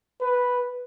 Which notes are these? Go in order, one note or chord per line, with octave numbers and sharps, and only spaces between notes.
B4